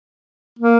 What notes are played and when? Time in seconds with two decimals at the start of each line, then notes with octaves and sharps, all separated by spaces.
0.59 A#3